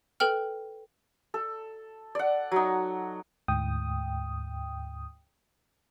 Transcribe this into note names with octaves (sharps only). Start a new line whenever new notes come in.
A4 B4 G5 F6
A4
D5 F#5
F#3 D#4
D2 G#2 G5 D#6